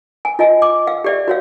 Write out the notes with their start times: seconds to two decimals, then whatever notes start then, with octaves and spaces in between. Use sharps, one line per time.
0.25 G#5
0.39 F4 D#5 G#5
0.62 D6
0.87 F5
1.04 G4 D5 E5
1.28 F#4 C#5 F5